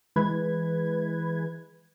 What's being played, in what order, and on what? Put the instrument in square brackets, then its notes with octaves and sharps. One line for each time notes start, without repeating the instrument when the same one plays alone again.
[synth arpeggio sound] E3 G#3 B4 G#6